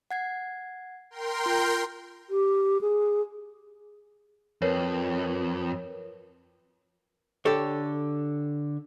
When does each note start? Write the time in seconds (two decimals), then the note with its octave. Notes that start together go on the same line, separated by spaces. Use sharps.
0.11 F#5 G#6 C7
1.11 A#4 G5 C6
1.46 F4 G6
2.30 G4
2.81 G#4
4.62 F2 A#4 B4 C#5
7.45 D3 G4 A4 C#5